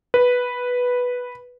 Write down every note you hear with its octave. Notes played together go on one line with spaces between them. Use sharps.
B4